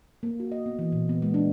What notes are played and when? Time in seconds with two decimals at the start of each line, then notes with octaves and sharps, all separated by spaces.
0.23 A#3
0.40 F#4
0.52 D#5
0.66 B3
0.79 E3
0.92 A#2
1.09 B3
1.22 G#3
1.34 D4